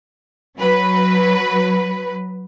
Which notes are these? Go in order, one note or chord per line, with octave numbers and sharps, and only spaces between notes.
F#3 B4